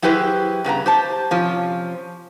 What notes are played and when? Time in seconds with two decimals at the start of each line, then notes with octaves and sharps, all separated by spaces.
0.02 F#3 E4 G4 G#4 B4 C5
0.64 G2 C#3 B3 A#5
0.86 G4 C5 A5
1.31 C3 F3 C#4